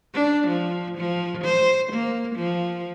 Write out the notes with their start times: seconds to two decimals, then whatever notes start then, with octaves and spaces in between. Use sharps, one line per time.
0.14 D4
0.48 F3
0.98 F3
1.45 C5
1.93 A#3
2.36 F3